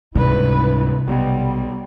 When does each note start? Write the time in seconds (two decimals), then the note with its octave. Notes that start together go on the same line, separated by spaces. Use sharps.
0.15 C#2 G#2 C3 G3 E4 B4
1.08 B1 G3 B3